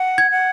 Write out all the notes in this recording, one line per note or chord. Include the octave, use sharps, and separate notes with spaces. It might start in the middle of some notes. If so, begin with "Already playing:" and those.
Already playing: F#5
G#6
F#5